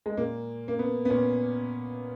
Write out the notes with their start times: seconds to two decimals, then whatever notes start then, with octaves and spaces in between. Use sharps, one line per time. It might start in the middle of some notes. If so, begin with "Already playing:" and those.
0.06 G#3
0.17 A#2 A#3
0.68 A#3
0.79 B3
1.05 B3
1.10 A#2 C#4